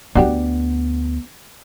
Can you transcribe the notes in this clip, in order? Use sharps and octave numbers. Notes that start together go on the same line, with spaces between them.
D2 B3 D4 F#4 G4